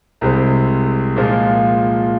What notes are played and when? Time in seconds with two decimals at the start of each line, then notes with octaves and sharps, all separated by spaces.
0.21 C2 C3 G#3 C4
1.16 A#2 F3 G#3 F4